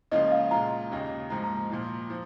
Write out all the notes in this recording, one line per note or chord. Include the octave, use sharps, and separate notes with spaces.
C#2 C#3 F3 A#3 F4 D#5
F5
A#2 G#3 F4 A#5
D#2 C#3 A#3 D#4
G#2 F3 A#3 A#5
A#5
A#5
A#2 F3 A#3
F3